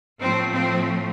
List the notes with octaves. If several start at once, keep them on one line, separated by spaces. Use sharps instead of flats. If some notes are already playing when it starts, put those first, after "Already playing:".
A2 F3 A3 C4
C4